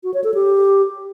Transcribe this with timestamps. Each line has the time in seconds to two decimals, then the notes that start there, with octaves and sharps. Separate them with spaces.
0.04 F#4
0.14 C#5
0.24 A4
0.34 G4